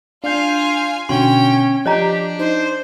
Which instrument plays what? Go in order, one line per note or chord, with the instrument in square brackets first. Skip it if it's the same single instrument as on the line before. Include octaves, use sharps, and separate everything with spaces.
[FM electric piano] D4 G6 [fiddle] F4 G#5 [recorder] F5
[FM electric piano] B2 D3 F#4 [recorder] C#4 [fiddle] G5 [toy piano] C6
[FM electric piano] F3 [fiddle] D4 [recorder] G4 [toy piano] C#5 D#5 A#5
[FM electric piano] D#4 [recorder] C5